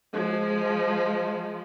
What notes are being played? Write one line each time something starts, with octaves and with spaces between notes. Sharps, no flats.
F3 G#3